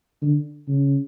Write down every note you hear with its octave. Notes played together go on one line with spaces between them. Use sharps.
D3
C#3